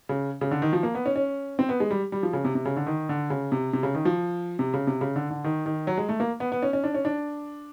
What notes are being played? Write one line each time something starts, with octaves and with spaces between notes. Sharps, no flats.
C#3
C#3
D3
D#3
F3
A#3
B3
C#4
C#4
C4
B3
G#3
G3
G3
F3
C#3
C3
C3
C#3
D3
D#3
D3
C#3
C3
C3
C#3
D#3
F3
C3
C#3
C3
C#3
D3
D3
D#3
D#3
F#3
G#3
A3
A#3
B3
B3
C#4
C#4
D4
C#4
D4